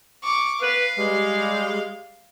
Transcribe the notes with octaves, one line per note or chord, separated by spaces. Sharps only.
C#6 D6
B4 F5
G3 G#3